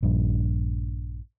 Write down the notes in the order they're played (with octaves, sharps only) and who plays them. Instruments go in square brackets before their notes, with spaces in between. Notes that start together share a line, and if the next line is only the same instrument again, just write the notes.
[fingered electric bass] A#1 G2